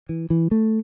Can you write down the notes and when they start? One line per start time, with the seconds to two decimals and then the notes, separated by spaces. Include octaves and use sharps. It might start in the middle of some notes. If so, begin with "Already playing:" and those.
0.09 E3
0.30 E3
0.51 A3